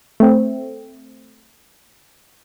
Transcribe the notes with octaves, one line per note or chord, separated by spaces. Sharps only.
A3 C4